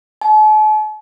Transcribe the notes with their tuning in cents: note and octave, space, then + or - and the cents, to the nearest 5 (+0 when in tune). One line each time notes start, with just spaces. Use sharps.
A5 -45